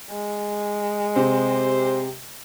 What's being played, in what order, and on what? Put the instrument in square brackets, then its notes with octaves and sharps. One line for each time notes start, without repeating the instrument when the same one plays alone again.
[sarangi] G#3
[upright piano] C3 [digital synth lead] G4 [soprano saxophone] C5